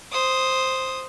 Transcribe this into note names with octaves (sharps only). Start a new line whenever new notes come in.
C5 D#6